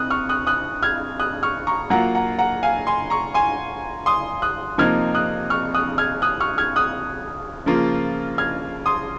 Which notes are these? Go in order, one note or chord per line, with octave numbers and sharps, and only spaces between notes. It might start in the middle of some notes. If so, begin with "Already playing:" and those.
Already playing: C3 D#6 F#6
C#6 F6
D#6 F#6
D#6 F#6
F6 G#6
D#6 F#6
C#6 F6
A#5 C#6
F#3 A#3 F4 F#5 A#5
F#5 A#5
F#5 A#5
F5 G#5
G#5 C6
A#5 C#6
G#5 C6
C6 D#6
D#6 F#6
C3 F3 A#3 D#4 F6 G#6
D#6 F#6
C#6 F6
D#6 F#6
F6 G#6
D#6 F#6
C#6 F6
F6 G#6
D#6 F#6
C#3 F3 A#3 F4
F6 G#6
C6 D#6